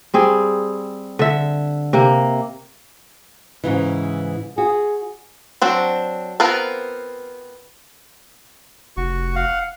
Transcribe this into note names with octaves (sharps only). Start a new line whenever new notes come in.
G3 C4 G#4
D3 E5
C3 A#3 A#4
G#2 C#3 E3
F#4 G#4
F#3 C4 D4
B3 C4 F4 A#4 B4
F1 F#4 C#6
F5 F#5